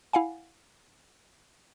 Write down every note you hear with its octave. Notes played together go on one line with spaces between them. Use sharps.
E4 F5 F#5 G#5